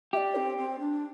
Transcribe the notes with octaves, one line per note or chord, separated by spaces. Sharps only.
G4 D5 E5
C4
C4
D4